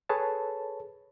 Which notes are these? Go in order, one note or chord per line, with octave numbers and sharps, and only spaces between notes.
G#4 A4 B4 C#5 A5